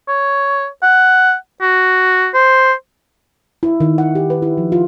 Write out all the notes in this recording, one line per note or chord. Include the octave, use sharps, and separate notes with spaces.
C#5
F#5
F#4
C5
E4
D#3
F#5
G4
B4
E4
F3
F4